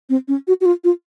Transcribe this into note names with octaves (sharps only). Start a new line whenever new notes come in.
C4
C#4
F#4
F#4
F4
F4